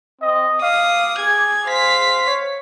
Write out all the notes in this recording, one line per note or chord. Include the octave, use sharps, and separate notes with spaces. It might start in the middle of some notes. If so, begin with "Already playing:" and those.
C4 D#5
F5 D6 D#6
G#4 G#6
C5 F5 B6
C#5